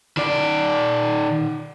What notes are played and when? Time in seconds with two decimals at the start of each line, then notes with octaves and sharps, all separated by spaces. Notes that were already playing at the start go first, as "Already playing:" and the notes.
0.17 D#3 D5